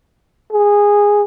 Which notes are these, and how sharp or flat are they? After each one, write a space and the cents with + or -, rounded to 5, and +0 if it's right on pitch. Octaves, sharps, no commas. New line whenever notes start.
G#4 -15